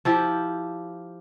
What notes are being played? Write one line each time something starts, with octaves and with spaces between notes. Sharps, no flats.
F3 E4 G4